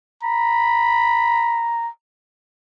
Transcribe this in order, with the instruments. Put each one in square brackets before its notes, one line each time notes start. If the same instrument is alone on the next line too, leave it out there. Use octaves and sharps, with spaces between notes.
[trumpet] A#5 [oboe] B5